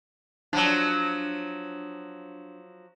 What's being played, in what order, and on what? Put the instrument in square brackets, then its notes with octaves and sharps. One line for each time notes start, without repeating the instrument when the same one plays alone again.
[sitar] F3 F#3 [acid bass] D4